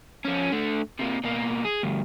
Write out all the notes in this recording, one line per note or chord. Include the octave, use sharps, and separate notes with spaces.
F3 C#4
D3 A3
C3 A#3
B2 A#3
G#4
D2 G2